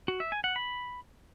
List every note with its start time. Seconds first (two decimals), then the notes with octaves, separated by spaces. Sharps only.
0.08 F#4
0.20 E5
0.32 G#5
0.44 F#5
0.56 B5